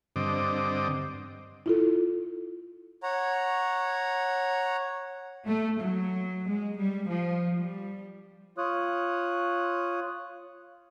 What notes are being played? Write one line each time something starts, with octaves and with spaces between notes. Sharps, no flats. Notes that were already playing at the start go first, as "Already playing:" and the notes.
G2 D3 C4 D#5 D6
E4 F4 A4
C#5 F#5 A#5
A3
F#3
G#3
G3
F3
G3
F4 C#5 D#6 F#6